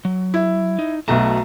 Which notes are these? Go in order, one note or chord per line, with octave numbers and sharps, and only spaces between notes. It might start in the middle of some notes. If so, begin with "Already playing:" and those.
F#3
E4
D#4
B1 B2 A3 A5 A#5